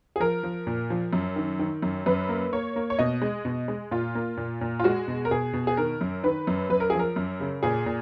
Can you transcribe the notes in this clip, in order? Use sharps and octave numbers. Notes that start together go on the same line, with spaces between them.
G#4
F3 A#4
F3
A#2
F3
F#2
D#3
D#3
F#2
F#2 B4
A#3
A#3 C#5
A#3
C#5
B2 D#5
G#3
B2
G#3
A#2 F4
A#3
A#2
A#2
F4
G#3 F#4
B2
A#4
B2 G#4
B2
G#4
D#3 A#4
F#2
D#3 B4
F#2
F#2 B4
A#4
F3 G#4
A#4
F#2
C#3
A#2 G#4
A#2